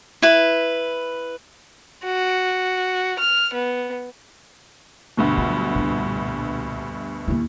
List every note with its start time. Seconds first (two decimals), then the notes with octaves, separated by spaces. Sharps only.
0.22 E4 B4
2.04 F#4
3.19 F6
3.54 B3
5.17 D2 G2 B2
5.38 F#3 F4
5.75 C2 A#2
7.28 D#2 E4